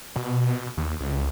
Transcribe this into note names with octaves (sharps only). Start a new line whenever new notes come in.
B2
D#2
C#2